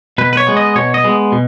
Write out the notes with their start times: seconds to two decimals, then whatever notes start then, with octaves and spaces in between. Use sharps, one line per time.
0.18 B2 B4
0.33 B4
0.37 C#5
0.47 G#3 B3
0.57 D#5
0.76 B2 C#5
0.94 D#5
1.04 G#3 B3
1.32 B2